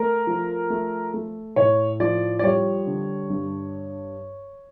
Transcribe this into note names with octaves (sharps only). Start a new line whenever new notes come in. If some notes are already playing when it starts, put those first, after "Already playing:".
Already playing: A3 A#4
F3
A3
A3
A2 C#5
F3 D5
D5
G3 C#5
D3
G2